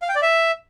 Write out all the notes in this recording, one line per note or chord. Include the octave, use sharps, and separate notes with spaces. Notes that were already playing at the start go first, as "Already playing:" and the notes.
F5
G5
D5
E5